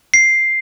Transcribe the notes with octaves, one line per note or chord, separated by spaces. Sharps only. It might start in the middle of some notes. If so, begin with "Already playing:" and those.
C7